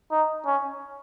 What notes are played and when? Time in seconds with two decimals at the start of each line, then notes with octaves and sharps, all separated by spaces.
0.11 D#4
0.46 C#4